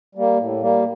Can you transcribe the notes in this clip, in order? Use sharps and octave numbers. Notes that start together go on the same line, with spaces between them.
G3 A#3
A2
G3 A#3